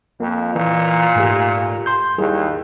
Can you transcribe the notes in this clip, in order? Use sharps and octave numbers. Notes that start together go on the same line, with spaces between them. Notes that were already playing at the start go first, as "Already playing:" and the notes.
F2 A#3
A#2 E3
G#2 A3 G4
C6 G6
D#2 G3 E4 G#4